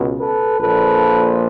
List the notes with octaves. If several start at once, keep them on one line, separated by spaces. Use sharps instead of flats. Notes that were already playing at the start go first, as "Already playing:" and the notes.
Already playing: C#2 B2
A4 B4
A#1 A#2 F3 A4 B4